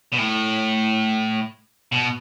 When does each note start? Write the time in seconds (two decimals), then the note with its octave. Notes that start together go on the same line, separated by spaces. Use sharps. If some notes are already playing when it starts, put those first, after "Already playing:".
0.12 B2
0.18 A2
1.92 B2